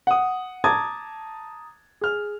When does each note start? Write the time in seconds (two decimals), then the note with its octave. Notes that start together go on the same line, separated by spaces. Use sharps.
0.07 F#5 D#6
0.64 A5 A#5 D6 D#6 G#6 A6
2.01 G#4 F6